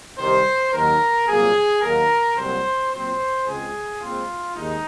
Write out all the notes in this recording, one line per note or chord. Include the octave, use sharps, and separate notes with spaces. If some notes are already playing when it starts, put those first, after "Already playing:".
C2 C3 D#3 C5
D#2 D#3 F#3 A#4
C2 A#2 F#3 A#3 G#4
D#2 D#3 F#3 A#3 A#4
C2 A#2 F#3 C4 C5
A#2 F#3 C4 C5
C#2 C#3 G#3 C4 G#4
A#2 G#3 C4 F4
D#2 D#3 G#3 D#4